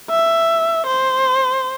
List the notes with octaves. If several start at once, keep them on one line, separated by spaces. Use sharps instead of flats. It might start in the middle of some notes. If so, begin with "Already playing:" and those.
E5
C5